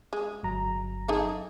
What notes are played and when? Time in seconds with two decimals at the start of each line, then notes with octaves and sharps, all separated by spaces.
0.13 G#3
0.43 G1 F#3 A#5
1.08 D#4 G#4 A4